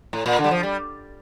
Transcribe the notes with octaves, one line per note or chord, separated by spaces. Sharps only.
A2
A#2
D3
G3
F3
G3